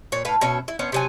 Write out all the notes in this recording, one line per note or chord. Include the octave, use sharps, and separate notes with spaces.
A#2 C#5
A2 B4 F5
B2 C#4 E5
E4
B3 C#4 C5
C3 F#3 G#5